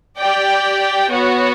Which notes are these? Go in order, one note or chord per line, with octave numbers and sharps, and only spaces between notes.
G4 D5 G5
B3 F#4 C#5